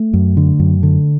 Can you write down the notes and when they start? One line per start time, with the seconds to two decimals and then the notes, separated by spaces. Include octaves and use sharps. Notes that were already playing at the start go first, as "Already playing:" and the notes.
Already playing: A3
0.13 F#2
0.37 D3
0.59 F#2
0.83 D3